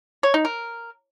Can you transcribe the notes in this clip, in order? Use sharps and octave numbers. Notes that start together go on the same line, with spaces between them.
C#5
D#4
A#4